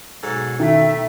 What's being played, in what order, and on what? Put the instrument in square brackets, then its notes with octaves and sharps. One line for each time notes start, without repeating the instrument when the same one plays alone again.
[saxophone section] G#2 F#3 A4 [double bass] B2
[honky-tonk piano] D#3 [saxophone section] A3 [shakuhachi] E5